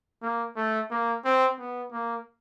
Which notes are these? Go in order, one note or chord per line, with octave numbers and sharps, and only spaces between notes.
A#3
A3
A#3
C4
B3
A#3